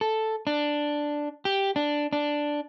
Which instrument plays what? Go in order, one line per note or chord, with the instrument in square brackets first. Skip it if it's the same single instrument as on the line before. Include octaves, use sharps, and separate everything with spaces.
[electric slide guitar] A4
D4
G4
D4
D4